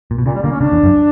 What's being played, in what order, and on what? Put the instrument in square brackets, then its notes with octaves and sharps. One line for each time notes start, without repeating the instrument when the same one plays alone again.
[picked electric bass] A#2
B2
[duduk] A#2 [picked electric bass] C#3
[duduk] G3
[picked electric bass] D3 [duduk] A#3
[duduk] C#4
[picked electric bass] C#3 [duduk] D4
[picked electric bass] E2
F#2